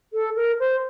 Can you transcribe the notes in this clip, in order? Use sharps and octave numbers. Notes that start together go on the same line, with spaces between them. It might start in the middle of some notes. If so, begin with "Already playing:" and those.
A4
A#4
C5